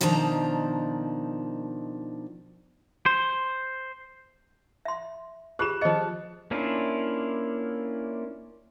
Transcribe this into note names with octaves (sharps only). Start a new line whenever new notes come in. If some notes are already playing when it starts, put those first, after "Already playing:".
B2 D#3 F3 D4 C5 A#5
C5
E5 C6
F4 G4 G#4 F#6 E7
F3 G#4 D#5 C#7
A#3 C#4 D4 E4 F4